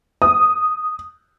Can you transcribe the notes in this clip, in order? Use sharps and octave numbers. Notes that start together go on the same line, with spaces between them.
D#6